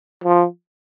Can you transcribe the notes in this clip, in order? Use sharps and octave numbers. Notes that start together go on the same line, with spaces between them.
F3